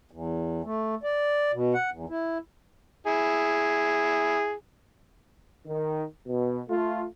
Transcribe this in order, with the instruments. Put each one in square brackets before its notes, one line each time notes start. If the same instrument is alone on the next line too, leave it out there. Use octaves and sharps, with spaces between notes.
[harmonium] E2
A3
D5
B2
F#5
E2
E4
[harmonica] E4 G#4
[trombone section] D#3
B2
A3 F4